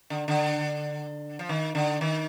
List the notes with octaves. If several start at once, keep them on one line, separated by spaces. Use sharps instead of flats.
D3
D3
F3
D#3
D3
D#3